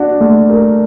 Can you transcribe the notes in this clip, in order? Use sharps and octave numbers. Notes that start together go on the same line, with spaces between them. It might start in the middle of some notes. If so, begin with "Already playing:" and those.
Already playing: D4 F#4
A3
A#4